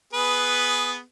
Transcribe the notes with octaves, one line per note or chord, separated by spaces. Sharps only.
B3 G#4 B4